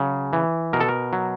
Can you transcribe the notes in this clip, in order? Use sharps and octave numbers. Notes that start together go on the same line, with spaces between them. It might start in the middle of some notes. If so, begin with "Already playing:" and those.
Already playing: C#3 F#3
E3
B2 A#4
A4
A#4
F#3